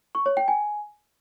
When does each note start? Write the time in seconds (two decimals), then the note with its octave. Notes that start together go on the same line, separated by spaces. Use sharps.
0.15 C#6
0.26 C#5
0.37 G5
0.48 G#5